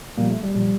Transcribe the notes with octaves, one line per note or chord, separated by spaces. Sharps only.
A#2 F3 G3 A#3
A3
G3
A#2 F3 G3